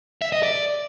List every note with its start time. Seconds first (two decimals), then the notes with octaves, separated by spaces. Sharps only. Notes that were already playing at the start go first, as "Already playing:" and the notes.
0.22 E5
0.32 D#5
0.43 D5